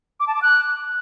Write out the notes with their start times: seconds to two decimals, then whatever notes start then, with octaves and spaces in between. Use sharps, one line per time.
0.20 D6
0.27 A5
0.35 D6
0.42 F#6